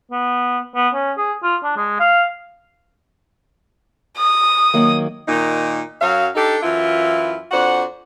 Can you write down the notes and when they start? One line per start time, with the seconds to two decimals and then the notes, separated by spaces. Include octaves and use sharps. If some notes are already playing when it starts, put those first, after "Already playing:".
0.11 B3
0.75 B3
0.94 C#4
1.17 G#4
1.43 F4
1.63 D4
1.76 G#3
1.99 F5
4.17 D#6
4.74 D#3 F#3 A#3
5.27 A#2 D#3 D#4
6.01 F#2 F#3 C#5 F5
6.35 D4 D#4 G4 A4
6.63 F#2 E3 E4 F4
7.52 F2 D4 F#4 C5 F#5